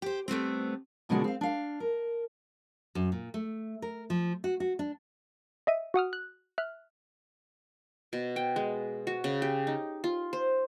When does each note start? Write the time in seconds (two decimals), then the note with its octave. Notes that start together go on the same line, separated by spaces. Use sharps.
0.02 G4 C5
0.28 G3 A3 B3 C4
1.09 D#2 B2 D3 G#3 C#4 F#4
1.24 C4 F5
1.41 D4 F5
1.80 A#4
2.95 F#2
3.12 A#2
3.34 A3
3.82 A#4
4.10 F3
4.44 F#4
4.60 F#4
4.79 D4
5.67 D#5 E5 D#7
5.94 F#4 F#5 D#6 F6
6.13 F#6
6.58 E5 F6 F#6
8.13 B2
8.36 G5
8.56 G#3
9.07 F#4
9.24 C#3
9.42 G4
9.67 D#4
10.04 F4
10.33 C5